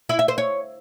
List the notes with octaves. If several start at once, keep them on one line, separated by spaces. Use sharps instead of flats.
E4
E5
C5
C#5